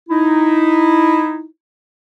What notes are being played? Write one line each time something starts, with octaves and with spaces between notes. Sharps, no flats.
D#4 E4